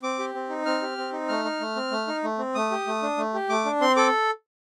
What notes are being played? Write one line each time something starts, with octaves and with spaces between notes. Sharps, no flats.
C4 D6
G4
C4
D#4
C4 F6
G4
C4
D#4
A3 F6
D#4
A3
C4
A3
D#4
A3
C4
A3 D#6
G4
A3
D4
A3
G4
A3 D6
D4
C4 C6
A4 D6